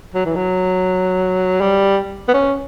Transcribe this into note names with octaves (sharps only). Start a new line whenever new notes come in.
F#3
E3
F#3
G3
B3
C#4